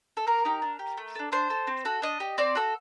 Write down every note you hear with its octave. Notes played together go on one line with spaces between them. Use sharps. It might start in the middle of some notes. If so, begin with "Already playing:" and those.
A4
A#3 A#4
D#4 G4
D4
G4
A3
D4 A4
D4 C5
A4
C4
F#4 A4
D4 D#5
G4
C4 D5
F#4 A4